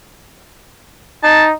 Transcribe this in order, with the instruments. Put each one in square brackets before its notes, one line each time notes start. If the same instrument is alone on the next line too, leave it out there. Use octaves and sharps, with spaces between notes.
[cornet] D#4 [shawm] A5